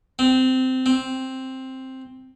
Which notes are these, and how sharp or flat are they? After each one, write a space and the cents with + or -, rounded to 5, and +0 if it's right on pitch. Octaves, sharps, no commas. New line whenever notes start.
C4 -15
C4 +5